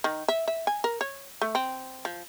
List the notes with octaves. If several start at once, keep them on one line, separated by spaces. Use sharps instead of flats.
D#3
E5
E5
G#5
A#4
C#5
A3
C4
F3